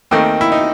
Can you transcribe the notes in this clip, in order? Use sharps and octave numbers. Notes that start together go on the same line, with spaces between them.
D#2 D#3 A3 C4
E4
D#4